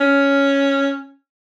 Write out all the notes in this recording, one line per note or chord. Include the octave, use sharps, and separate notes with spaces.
C#4